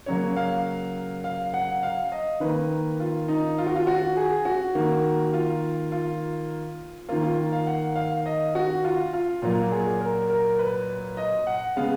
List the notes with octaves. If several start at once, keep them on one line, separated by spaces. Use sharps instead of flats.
C#3 F#3 A#3 C#5
F5
F5
F#5
F5
D#5
D#3 A#3 B4
F4
D#4
F4
F#4
F4
F#4
G#4
F#4
D#3 A#3
F4
F4
D#3 A#3 F4
F4
F5
F#5
F5
D#5
F#4
F4
F4
A#2 F#3 A#3 F4
G#4
A#4
A#4
B4
D#5
F#5
C#3 G#3 B3 F5